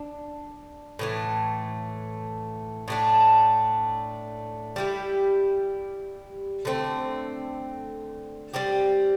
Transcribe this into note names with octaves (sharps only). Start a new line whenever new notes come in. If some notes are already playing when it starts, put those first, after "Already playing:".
Already playing: D4
A2 E3 A3
A2 A3 D4
G3 E4 G4
D3 A3 C4
G3 C4 G4